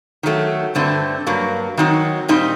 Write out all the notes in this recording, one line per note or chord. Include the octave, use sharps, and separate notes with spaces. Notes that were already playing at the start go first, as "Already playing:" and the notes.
D#3 F#3 A3
G2 D3 A3 C4
G2 F#3 A#3
D#3 F#3 C4 D#4
A#2 G3 C4 D#4